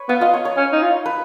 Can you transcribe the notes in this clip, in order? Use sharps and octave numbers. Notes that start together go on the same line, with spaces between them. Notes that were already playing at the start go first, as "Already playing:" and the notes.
Already playing: B4 C#5
B3 F5
F4 D#5
C#5
C#5
C#4
D#4
F4
B4